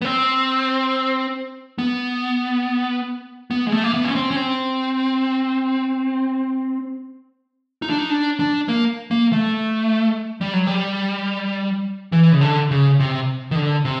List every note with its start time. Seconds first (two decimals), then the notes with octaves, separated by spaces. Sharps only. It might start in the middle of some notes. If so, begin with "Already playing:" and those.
0.02 B3
0.05 C4
1.78 B3
3.51 B3
3.67 G#3
3.72 A3
3.84 A#3
3.94 B3
4.04 C#4
4.15 C4
4.31 C#4
4.36 C4
7.82 D#4
7.90 D4
7.98 D#4
8.10 D4
8.40 D4
8.68 A#3
9.11 A#3
9.32 A3
10.41 G3
10.53 F#3
10.67 G3
12.12 E3
12.32 C#3
12.41 D3
12.71 C#3
12.99 C3
13.51 D#3
13.56 D3
13.85 C3